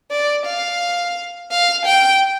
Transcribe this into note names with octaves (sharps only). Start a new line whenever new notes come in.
D5
F5
F5
G5